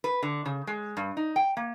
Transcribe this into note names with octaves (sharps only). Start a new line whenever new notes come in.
B4
D3
C#3
G#3
G2
D#4
G5
A#3